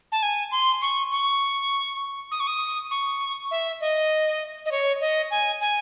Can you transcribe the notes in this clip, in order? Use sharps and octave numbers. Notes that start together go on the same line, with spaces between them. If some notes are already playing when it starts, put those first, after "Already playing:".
A5
G#5
C6
C#6
C#6
D#6
C#6
D#6
C#6
E5
D#5
D#5
C#5
D#5
G#5
G#5